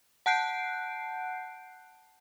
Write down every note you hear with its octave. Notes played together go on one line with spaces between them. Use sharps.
F#5 A5 F#6 G6 C7 D7